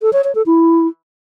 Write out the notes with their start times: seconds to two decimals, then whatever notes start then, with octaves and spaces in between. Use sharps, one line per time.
0.02 A4
0.13 C#5
0.24 C#5
0.35 A4
0.46 E4